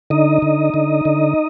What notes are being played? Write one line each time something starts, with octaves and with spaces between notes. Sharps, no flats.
D3 D#4 D#5
D3
D3
D3